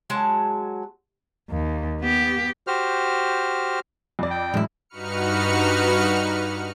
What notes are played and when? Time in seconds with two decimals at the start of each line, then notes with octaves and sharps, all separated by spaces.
0.10 F#3 G#3 A5
1.50 D#2
2.01 B3 G4
2.67 F#4 G4 C5 F6
4.19 F2 D5
4.31 G5
4.54 F#2 A2 E3 G#3 E4
4.89 G2 D#4 F#4 B4 F6 C#7